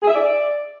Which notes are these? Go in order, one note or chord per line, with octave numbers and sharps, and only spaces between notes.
G#4
E5
D5